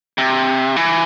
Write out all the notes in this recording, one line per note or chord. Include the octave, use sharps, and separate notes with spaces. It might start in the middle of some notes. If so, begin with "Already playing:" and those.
C3
E3